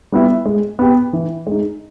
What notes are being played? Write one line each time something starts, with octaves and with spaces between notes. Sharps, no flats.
G3 B3 E4
G#3
B3 G4
E3
G#3 D#4